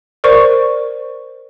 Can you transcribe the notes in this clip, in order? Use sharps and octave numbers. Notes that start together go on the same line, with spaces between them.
A#4 C5 D5 C#6